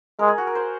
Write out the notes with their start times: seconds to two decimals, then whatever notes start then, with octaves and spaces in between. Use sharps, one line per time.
0.19 G#3 A#4
0.28 G#4
0.38 F#4
0.47 A#4
0.55 C5